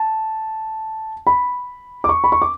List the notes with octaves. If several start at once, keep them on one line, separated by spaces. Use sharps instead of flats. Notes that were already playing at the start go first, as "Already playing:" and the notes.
Already playing: A5
B5
D6
C#6
B5
C#6
D6